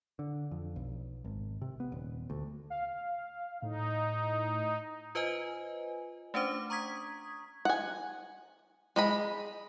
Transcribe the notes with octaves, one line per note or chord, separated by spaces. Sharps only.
D3
F2
B1
G#1
C3
B3
D#1
D2
F5
A2 D#4
F4 B4 C5 D#5 G#5
A3 C#4 D4 C5 D6
A#5 C#6 D#6 G#6 B6
F#5 G#5
G#3 D#5 B5